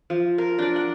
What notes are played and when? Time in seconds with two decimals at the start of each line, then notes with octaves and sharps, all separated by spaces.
0.10 F3
0.38 A#4
0.58 D4 D5
0.76 F#5